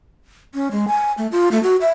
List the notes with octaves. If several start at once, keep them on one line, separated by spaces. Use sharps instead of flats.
C#4
G#3
G#5
A3
F4
A3
F#4
E5